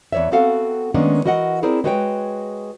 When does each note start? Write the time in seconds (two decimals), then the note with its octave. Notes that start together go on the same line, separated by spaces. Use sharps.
0.12 E2 E3 C#5 D5 E5
0.32 B3 C4 F#4 A4 F5 F#5
0.94 D#3 G#3 A#3 B3 C#4 D4
1.25 E3 F#4 A#4 D#5 E5 F#5
1.63 C4 E4 G#4 A#4 C5 D5
1.84 G#3 F#4 B4 C#5 F5 G5